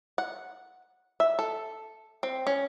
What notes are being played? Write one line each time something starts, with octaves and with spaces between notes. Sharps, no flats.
F#5
E5
A4
C4
C#4